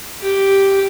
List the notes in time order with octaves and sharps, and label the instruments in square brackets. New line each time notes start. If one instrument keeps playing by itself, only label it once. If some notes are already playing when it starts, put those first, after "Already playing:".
[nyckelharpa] G4